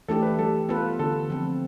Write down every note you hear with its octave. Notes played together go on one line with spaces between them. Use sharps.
E3 A3 D4 G4 A4
B4
G3 A4
B3 F4 A4 B4
D3 A4
F3 C4